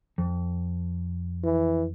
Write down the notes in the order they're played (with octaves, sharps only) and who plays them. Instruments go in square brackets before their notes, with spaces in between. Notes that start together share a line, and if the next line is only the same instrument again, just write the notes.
[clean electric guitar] F2
[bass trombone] E3